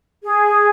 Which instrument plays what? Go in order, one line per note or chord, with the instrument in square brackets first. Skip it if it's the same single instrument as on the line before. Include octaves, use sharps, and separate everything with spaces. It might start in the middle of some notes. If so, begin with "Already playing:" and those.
[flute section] G#4